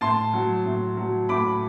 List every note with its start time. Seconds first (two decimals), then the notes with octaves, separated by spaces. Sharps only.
0.01 A2 A5 C6
0.33 F#3
0.66 A2
0.97 F#3
1.29 A2 B5 D6